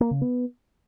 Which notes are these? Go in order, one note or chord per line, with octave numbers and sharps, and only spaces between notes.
A#3
C#3
B3